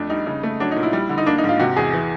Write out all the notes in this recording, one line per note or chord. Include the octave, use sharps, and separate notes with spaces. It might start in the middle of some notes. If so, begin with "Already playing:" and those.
Already playing: F2 A3 D4
G3 D#4
C#3
A3
F#3 D4
D#4
A#2
E4
G3
D3
D#4
A#3 D4
D#4
G#2 F4
C3 F#4
E2 G#4
E3